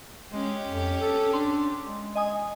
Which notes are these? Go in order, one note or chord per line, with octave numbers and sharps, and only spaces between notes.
G#3 C#4 G4
F2
A4
D4 C6
G#3
D#5 G#5 D#6